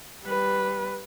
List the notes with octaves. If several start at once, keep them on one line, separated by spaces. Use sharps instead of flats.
G3 B4